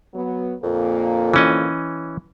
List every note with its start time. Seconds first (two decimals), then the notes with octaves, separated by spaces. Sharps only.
0.15 F#3 B3
0.63 F2 A#2 D3 A#3
1.34 E3 C#4 D#5